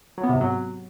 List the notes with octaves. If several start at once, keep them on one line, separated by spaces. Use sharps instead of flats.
F#3
B3
C3
G#2
F#3